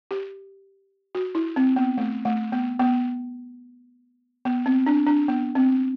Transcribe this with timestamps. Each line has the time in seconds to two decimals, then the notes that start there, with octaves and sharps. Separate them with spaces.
0.11 G4
1.15 F#4
1.35 E4
1.56 C4
1.76 B3
1.97 A3
2.25 A3
2.52 B3
2.79 B3
4.45 B3
4.66 C4
4.87 D4
5.06 D4
5.28 B3
5.55 C4